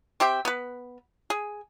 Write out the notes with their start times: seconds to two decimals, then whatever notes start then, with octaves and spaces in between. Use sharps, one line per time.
0.20 C4 G4 E5 G5
0.45 B3 B4
1.30 G#4